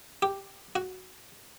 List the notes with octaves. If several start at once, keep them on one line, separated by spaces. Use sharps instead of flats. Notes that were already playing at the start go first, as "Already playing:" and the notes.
G4
F#4